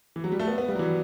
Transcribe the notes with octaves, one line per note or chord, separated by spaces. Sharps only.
E3
F#3
G3
A3
B3
B3
G3
F#3
E3